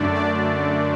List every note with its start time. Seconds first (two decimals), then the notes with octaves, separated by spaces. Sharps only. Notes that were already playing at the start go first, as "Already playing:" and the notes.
Already playing: F#2 D3 A3 D4 D5
0.15 D5